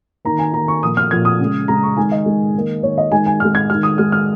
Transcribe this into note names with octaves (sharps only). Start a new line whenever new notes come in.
D#3 A#3 A#5
G#5
D#3 A#3 A#5
C#6
A#2 F3 A#3 D#6
F6
A#2 F3 A#3 G#6
D#6
C#3 G#3
C#3 G#3 A#5
C#6
D#3 G#3 G#5
D#5
D#3 G#3
D#3 A#3
D#3 A#3 C#5
D#5
D#3 G#3 G#5
G#5
D#3 G#3 F6
G#6
D#3 G#3 F6
D#6
D#3 G#3 F6
F6